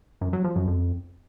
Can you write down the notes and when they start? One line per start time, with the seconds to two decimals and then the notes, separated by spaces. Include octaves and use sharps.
0.21 F#2
0.33 F#3
0.44 F3
0.56 F#2
0.67 F2